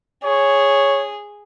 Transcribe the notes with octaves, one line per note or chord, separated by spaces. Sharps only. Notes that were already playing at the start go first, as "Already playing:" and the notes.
G#4 C#5